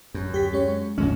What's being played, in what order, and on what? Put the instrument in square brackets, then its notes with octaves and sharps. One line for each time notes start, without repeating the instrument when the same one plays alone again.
[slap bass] F#2
[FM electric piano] D2 G4 B6
G#3 C#4 C#5
[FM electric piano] D#2 A2 F3 [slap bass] C#3 G#3 C#4